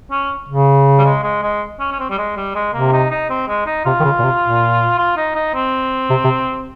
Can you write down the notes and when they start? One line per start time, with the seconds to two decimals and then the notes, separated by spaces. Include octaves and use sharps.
0.11 C#4
0.48 C#3
0.98 G3
1.05 G#3
1.23 G#3
1.43 G#3
1.80 C#4
1.92 C#4
1.99 C4
2.10 G3
2.18 G#3
2.37 G3
2.55 G#3
2.73 C3 A#3
2.92 D#4
3.11 D#4
3.30 C4
3.48 G#3
3.66 D#4
3.85 C3 F4
4.00 D#3
4.04 C#3
4.19 A#2
4.24 C3
4.42 A#2
4.98 F4
5.17 D#4
5.35 D#4
5.54 C4
6.10 C3
6.24 C3